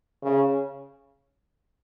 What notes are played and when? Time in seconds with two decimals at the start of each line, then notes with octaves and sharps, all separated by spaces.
0.24 C#3